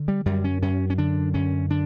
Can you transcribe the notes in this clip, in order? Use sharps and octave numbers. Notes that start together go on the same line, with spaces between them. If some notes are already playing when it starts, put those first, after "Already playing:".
Already playing: D3
G3
F#2 G3
C#4
F#2 C#4
C#4
D3 D4
F#2 C#4
D3 D4